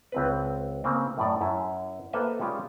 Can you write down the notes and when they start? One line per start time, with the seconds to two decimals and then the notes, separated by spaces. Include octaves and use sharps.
0.12 C#2 C4 B4
0.84 C#3 A#3 C4
1.18 F#2 A2 D5
1.41 F#2 E4
2.13 A#3 A4 B4 C5 D#5 E5
2.40 G3 G#3 C#4 F4 G4